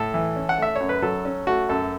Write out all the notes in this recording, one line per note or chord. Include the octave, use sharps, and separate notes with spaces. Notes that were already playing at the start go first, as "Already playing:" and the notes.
Already playing: A2 A4
E3
C#4
F#5
A3 E5
F#2 C#5
B4
F#3 A4
C#4
A3 F#4
F#2 A4